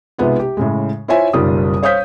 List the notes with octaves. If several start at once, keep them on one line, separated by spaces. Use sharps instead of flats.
B1 C3 G#3 B3 F4
G4
A2 C#3 G#3
E4 F4 C5 C#5 E5 G#5
F#1 B1 G3 F4 D#6
C5 C#5 F5 D#6 G6 B6